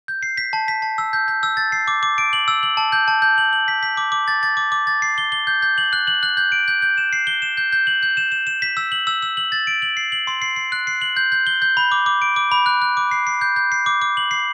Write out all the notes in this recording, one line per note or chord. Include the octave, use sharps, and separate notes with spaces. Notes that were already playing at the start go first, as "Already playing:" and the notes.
G6
C7
B6
A5
B6
A5
E6
G6
G6
E6
A6
C7
D6
D6
D7
F#7
E6
F#7
A5
G6
A5
G6
F#7
F#7
B6
B6
D6
D6
A6
A6
D6
D6
A6
C7
G7
G7
G6
G6
F#7
F#6
F#7
F#6
G6
D7
G6
G6
E7
C7
G7
E7
G6
G6
F#7
G6
E7
E7
E7
B6
E6
F#7
E6
E6
F#7
A6
D7
F#7
C7
F#7
C6
C7
C7
F#6
C7
F#7
G6
G6
G7
G6
B5
D6
D6
D7
D6
B5
F#6
F#6
D6
C7
C7
G6
G6
C7
D6
D6
F#7
C7